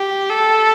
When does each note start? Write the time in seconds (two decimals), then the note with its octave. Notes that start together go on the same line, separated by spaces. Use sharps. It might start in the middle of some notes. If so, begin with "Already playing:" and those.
Already playing: G4
0.30 A4